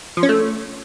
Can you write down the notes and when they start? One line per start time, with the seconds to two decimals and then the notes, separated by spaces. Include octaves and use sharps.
0.17 F3
0.23 C#4
0.29 A3